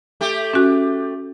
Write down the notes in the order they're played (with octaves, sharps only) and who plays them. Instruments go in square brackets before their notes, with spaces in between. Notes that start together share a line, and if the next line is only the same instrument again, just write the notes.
[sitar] A3 G4
[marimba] C#4 F#4